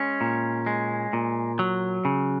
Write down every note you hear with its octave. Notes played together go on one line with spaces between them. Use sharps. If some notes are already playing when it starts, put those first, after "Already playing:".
Already playing: G#3 C#4
A#2
G#3
A#2
F#3
C#3